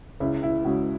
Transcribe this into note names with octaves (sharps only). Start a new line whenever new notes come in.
C#2 E4
E4
C#3 G#3 F#4